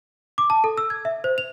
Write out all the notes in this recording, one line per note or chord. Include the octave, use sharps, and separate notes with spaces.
D6
A5
A4
E6
G#6
E5
C5
F7